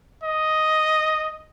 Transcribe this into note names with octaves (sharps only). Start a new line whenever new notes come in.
D#5